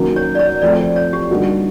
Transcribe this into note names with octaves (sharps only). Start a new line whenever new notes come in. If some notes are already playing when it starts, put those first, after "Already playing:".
Already playing: D#3 F#3 A#3 C#4
C#5
D5
C#5
F3 A3 C4 D5
C#5
G4
D3 G3 A#3 D#4 F#4